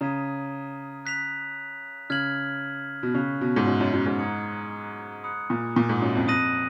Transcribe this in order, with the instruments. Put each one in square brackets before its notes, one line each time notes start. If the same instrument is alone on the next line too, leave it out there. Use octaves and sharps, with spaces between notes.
[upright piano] C#3 [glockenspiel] A#5 D#6 G#6 B6 D#7
[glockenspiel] F#6 B6 F7
[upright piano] C#3 [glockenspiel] F6 G#6 B6 F#7
[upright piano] B2
[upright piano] C#3 [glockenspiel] C#6 F#6 B6 F7
[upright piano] B2
G#2
F#2
F#2
F#2
G#2
[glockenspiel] A#5 D#6 G#6 C#7
B5 D#6 F#6 C#7
[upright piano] A#2
A#2
G#2
F#2
F2
[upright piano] F2 [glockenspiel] D#6 F#6 A#6 D#7 F#7